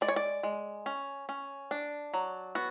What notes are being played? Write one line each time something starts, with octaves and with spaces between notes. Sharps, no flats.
G#3 D5
C#5
D5
G#3
C#4
C#4
D4
F#3
B3 F#4